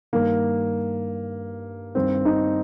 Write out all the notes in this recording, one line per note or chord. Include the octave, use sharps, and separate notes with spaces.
G2 D#3 A#3
G2 D#3 C4
D#4